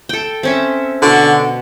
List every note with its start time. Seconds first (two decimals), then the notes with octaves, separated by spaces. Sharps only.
0.09 A4 G5
0.43 C4 C#4 E5
1.02 B2 D3 F#4